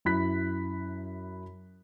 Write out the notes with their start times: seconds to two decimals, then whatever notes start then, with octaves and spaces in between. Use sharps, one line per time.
0.05 F#2 E4 B5 F#6 B6